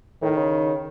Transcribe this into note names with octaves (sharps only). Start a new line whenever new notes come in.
A2 D#3
C#3